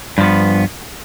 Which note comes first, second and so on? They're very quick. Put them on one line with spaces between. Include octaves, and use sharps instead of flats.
G2 F3 B3